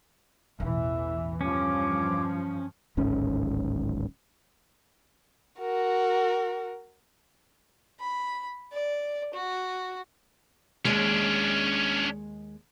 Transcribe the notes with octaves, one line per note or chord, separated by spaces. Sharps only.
A1 E2 B2 E3 E5
G2 F3 C#4 C#5 D6
D1 G#1 G#2 C#4
F#4 A#4
B5
D5
F#4
D#2 G#3 C#4 D4